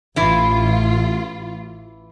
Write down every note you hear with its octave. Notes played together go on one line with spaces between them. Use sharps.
A1 E3 E4 F4